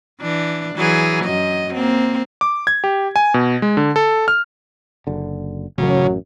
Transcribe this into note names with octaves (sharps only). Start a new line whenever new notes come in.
E3 D4
E3 F#3 G#4
F#2 D#5
A#3 C4
D6
G#6
G4
G#5
B2
G#3
D3
A4
F6
F#1 D3
A1 F#2 C#3 F#3